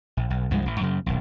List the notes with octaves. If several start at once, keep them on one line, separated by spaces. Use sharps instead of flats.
A#1
B1
C2 G2 F3 G#3
A1
F#2 C#3
D#1 B1